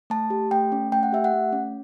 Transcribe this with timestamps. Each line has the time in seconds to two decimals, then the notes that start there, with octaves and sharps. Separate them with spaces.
0.10 A3 A5
0.30 G4
0.51 A3 G5
0.72 C#4
0.92 A3 G5
1.03 F#5
1.12 G4 E5
1.24 F#5
1.33 A3
1.52 C#4